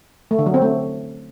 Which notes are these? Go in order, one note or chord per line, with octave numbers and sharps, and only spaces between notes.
A3
D3
F#3
C4
A3